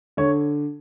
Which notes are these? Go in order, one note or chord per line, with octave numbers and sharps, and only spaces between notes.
D3 C#5